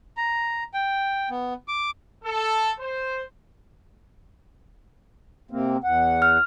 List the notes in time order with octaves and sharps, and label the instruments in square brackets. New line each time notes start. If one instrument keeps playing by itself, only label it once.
[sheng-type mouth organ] A#5
G5
B3
D6
[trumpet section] A4
C5
[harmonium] C3 A#3 C4
E2 F#5
[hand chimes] F6